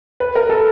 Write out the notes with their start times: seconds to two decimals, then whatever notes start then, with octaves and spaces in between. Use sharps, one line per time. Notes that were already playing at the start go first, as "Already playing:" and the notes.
0.20 B4
0.35 A#4
0.49 A4